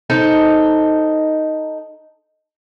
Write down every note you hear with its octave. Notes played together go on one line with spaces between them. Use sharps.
D#4 A4 C5